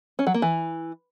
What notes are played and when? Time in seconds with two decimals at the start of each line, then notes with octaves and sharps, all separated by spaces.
0.19 C#4
0.27 F#3
0.34 A#3
0.42 E3